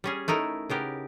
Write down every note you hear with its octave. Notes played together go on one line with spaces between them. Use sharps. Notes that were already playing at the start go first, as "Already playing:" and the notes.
G3 C#4 G#4
A3 D#4 E4 A#4
C#3 B3 G4 A#4